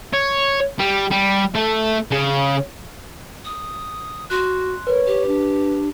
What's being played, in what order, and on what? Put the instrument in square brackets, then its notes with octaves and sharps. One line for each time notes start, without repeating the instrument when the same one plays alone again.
[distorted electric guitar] C#5
G3
G3
A3
C#3
[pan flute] D#6
[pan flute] F#4 [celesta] C6 F#6
[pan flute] A#4 [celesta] B4 [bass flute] C#5
[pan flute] G4
[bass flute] D4